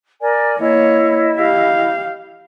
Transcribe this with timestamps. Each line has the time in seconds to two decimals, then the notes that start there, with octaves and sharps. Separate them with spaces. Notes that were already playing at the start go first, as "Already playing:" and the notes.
0.19 A#4 D5 G#5
0.59 A#3 E4 C#5 D#5
1.39 G4 F5